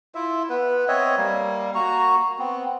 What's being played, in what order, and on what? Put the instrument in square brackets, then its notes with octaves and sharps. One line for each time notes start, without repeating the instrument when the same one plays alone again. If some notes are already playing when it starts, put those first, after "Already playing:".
[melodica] E4 F4 E5
B3 B4
C4 C#5 D#5 E5
G3 A#3
A#3 F#4 A#5 C#6
B3 C4